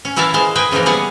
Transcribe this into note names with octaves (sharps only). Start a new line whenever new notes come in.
C#4
E3 E4 A#4 E5 F5 A5
E3 G#3 C5 F5
G#4 B4 D#5 G5 G#5
C#3 E3 F3 A#3 A#4
G3 B3 G#4 F5 F#5